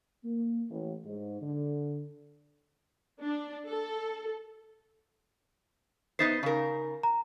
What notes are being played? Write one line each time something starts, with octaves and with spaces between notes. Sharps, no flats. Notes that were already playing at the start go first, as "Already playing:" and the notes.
A#3
A1
G#2
D3
D4
A4
B3 D#4 C5 A6 B6 C7
C#3 D#4 A#4
A#5